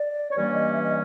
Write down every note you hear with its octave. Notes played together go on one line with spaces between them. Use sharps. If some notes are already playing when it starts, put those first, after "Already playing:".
Already playing: D5
C#5
G2 E3 G3 A#3 C#4 D5
D#5
E5
D#5